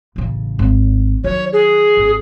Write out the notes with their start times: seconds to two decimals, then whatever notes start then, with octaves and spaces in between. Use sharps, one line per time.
0.16 A1 C#3
0.59 G#1
1.24 D#3 F#3 C#5
1.53 G#4
1.97 G#1